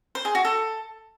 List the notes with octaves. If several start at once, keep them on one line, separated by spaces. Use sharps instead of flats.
C5
G#4
F#4
A4